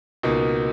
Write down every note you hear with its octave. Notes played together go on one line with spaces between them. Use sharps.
C#2 B2 A#3 D#4